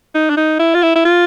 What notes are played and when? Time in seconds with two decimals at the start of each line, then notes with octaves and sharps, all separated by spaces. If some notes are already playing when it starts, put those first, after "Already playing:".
0.15 D#4
0.30 D4
0.37 D#4
0.60 E4
0.74 F4
0.83 E4
0.96 E4
1.05 F4